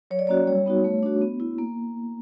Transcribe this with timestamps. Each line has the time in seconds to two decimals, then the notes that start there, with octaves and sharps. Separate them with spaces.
0.11 F#3 C#5
0.19 D5
0.27 A#3 C#4 F#4 C#5
0.47 G3 C#5
0.66 B3 D#4 F#4
0.84 A3
1.03 D4 F#4
1.22 B3
1.40 E4
1.58 A#3